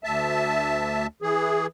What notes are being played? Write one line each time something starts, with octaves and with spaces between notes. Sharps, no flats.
D2 E5 A5
E3 G#4